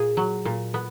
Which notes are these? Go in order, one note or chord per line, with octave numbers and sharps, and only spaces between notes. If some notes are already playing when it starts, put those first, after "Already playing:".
Already playing: A#2 G#4
F#3
A#2
B3